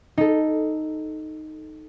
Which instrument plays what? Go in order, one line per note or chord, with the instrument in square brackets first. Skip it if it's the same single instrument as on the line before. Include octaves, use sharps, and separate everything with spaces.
[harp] D#4 A4